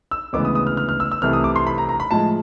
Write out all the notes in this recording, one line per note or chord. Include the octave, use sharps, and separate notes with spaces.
E6
D2 C#3 E3 G#3 B3 D6
D#6
D#6
F6
F6
F6
E6
E6
C2 C3 E3 A3 F6
D#6
D6
C6
B5
A#5
A#5
B5
A2 F3 G#3 A5